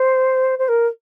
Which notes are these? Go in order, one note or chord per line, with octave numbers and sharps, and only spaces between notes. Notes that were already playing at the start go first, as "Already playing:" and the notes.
Already playing: C5
C5
A#4